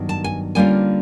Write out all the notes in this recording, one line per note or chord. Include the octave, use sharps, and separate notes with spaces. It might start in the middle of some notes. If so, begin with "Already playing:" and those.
Already playing: G2 D#3 F#3 B3
A5
G#5
D3 G3 A#3 C#4 F4 G#5